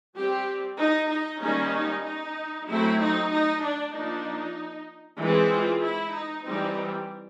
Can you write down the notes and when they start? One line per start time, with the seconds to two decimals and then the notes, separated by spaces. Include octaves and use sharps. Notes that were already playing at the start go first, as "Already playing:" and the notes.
0.16 G3 C4 G4
0.80 D#4
1.11 D#4
1.42 D#3 G3 A#3 C#4 D#4
1.74 D#4
2.05 D#4
2.69 F#3 A3 C4 E4
3.00 D#4
3.32 D#4
3.63 D4
3.94 F3 A#3 D4 D#4
5.20 E3 G#3 C4
5.51 F4
5.83 E4
6.14 D#4
6.46 E3 G3 C4 D#4